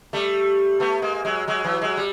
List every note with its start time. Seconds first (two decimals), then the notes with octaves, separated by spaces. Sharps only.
0.13 G3 A3
0.80 A3 B3
1.02 G#3 A#3
1.25 F#3 G#3
1.48 F#3 G#3
1.64 E3 F#3
1.81 F#3 G#3
1.97 G3